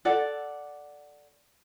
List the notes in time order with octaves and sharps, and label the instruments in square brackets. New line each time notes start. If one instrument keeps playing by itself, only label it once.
[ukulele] A4 D5 F#5